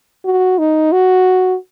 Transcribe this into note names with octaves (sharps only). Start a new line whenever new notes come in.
F#4
D#4
F#4